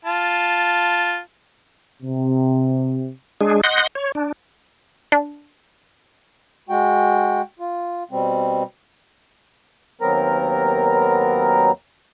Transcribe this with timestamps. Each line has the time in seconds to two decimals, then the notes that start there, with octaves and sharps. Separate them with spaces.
0.05 F4 A5
2.03 C3
3.41 G#3 D4 G#4
3.64 D#5 F#5 C6 F#6 G6 A#6
3.95 C#5
4.15 D4
5.12 D4
6.69 G#3 F#4 G5
7.59 F4
8.11 B2 G3 C4
10.01 D#2 F#3 B3 C4 A#4 A#5